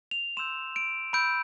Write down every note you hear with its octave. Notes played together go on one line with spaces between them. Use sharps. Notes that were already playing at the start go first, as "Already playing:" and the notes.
F7
C6 E6 G6 E7
D7
B5 E6 G6 D7